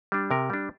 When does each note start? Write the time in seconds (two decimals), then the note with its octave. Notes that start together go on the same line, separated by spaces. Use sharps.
0.12 G3 D4
0.31 C3 A#4
0.50 G3 D4